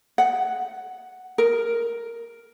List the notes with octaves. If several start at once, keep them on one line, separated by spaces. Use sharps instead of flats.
F#5
A#4